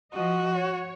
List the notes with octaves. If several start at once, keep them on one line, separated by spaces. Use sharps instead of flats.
F3 F#4 D#5
C#5